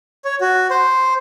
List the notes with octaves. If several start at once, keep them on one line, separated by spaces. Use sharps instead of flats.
C#5
F#4
C5